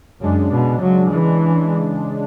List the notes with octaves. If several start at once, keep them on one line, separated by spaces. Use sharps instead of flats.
F#2 C#3 G#3 D4
B2
F#3
E3